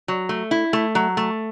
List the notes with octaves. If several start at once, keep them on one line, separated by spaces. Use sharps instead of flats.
F#3
A3
E4
A3
F#3
A3